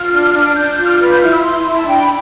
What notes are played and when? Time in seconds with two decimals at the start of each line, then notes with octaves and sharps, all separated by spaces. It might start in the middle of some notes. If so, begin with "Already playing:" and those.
Already playing: F4 F6
0.12 D4
0.34 D4
0.55 D4 G6
0.70 G6
0.77 F4
0.84 F6
0.99 B4 F6
1.10 G6
1.21 E4 F6
1.31 E6
1.43 E4 C6
1.65 E4
1.78 A5
1.86 D4 G5
2.01 B5